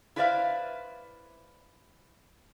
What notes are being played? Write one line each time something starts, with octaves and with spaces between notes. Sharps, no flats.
E4 B4 C5 D5 E5 F5